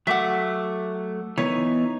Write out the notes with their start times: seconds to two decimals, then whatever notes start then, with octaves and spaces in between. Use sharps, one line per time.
0.07 F#3 A3 E5 F#5 D6
1.38 E3 B3 D#4 C#5